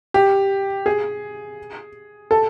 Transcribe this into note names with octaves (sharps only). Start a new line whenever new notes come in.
G4
G#4
A4